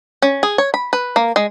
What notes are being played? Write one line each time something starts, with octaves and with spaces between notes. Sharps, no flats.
C#4
G#4
C#5
B5
B4
A#3
G#3